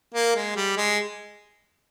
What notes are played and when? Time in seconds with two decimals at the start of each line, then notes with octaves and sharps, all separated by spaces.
0.14 A#3
0.36 G#3
0.56 G3
0.77 G#3